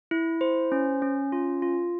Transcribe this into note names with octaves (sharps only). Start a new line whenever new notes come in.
E4
C5
C#4
C#4
F4
F4